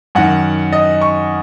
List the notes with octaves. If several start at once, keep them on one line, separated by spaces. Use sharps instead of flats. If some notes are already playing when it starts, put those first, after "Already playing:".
F#2 D#3 F#5
D#5
C#6